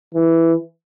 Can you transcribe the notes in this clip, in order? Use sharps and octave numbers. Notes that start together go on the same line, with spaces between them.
E3